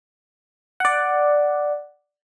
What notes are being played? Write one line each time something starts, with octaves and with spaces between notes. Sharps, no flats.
D5 F#5